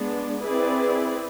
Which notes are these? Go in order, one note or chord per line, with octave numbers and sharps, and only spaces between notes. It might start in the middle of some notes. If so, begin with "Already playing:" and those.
Already playing: G#3 B3 D4
C4 E4 G#4 B4 D5